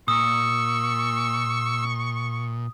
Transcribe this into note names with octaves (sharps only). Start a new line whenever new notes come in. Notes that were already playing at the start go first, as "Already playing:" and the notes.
A#2 C#6 D#6 E6